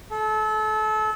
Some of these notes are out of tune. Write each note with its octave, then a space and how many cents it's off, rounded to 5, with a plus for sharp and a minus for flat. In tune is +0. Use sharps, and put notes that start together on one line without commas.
A4 -30